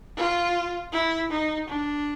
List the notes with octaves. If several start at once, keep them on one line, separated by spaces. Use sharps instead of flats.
F4
E4
D#4
D4